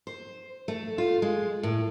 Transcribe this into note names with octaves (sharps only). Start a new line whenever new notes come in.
C5
A3
F4
G#3
A2